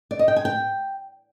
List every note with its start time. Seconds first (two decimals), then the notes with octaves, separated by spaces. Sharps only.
0.11 D5
0.19 D#5
0.28 G5
0.36 G#5
0.45 G5